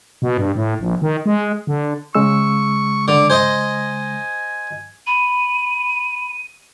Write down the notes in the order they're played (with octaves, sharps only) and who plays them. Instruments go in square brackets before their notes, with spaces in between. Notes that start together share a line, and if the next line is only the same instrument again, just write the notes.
[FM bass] B2
G2
A2
A#1
D#3
G#3
D3
[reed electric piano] C#3 G#3 E6 [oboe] C#6
[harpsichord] D3 [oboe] D6
[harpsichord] C5 D#5 [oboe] G#5
[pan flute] B5 [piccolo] D#7